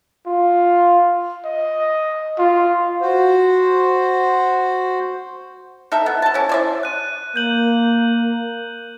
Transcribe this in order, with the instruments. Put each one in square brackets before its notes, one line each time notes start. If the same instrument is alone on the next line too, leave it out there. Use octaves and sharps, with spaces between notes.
[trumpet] F4
D#5
F4
[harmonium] F#4 C5
[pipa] D#4 A4 E5
B3
A4 A5
C#4 E4
C5 D5 E5
[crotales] F#6 D#7
[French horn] A#3 [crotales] G6 F#7